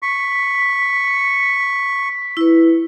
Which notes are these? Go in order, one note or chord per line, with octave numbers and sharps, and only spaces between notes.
C#6 B6
E4 B4